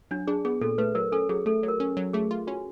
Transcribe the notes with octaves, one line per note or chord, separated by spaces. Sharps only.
F#3 D4
D4 G#4
B3 G#4
A#2 A4
A3 B4
F#3 A#4
C#4 A4
F#3 G#4
A3 A4
F#3
A#4
C#4
F#3
A3 G#4
F4
C#4 F#4